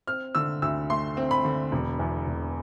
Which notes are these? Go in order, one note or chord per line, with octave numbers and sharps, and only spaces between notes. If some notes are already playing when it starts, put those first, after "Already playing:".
C4 F6
D3 E6
D2 E6
A3 C6
C4
B5
D3
E1
E2
E1